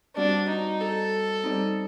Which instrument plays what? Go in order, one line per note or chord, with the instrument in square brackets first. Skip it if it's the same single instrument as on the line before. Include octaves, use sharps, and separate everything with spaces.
[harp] G3 C4 F#4 [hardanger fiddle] D4
[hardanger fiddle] D#4
A4
[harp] G3 C4 D#4